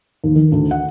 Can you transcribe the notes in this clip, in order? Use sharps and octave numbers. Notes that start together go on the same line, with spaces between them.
D#2
D#3
D2
F#5